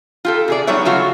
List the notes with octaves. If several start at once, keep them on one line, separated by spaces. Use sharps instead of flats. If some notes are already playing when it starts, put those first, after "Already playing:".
F4 G4 A4
C3 G#4 D5
F#3 G3 B3 D#4 C#5 E5
C#3 F#3 A3 F4 F#4